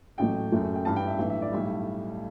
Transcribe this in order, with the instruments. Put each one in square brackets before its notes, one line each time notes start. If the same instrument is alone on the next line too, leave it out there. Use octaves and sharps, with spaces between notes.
[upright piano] A1 A2 F#3 A3 G5
F#1 F#2 F#3 A3
G5
A1 G2 E3 A5
G5
E5
B1 A2 E3 E5
E5
D5
B1 A2 G3 E5